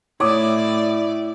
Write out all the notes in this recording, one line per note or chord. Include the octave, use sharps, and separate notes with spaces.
A2 E4 C#5 D5 D6 D#6